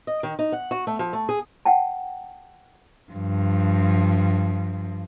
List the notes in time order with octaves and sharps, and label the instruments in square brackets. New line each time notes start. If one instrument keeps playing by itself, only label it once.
[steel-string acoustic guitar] D#5
D#3
D#4
F#5
F#4
A3
F3
A3
G#4
[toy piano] F#5 G5 A5
[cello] G2 F3